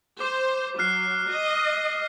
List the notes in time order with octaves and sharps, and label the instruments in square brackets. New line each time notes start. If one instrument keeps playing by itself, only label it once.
[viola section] C5 [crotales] D6
[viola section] F#3 [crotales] F6 F#6 C7
[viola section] D#5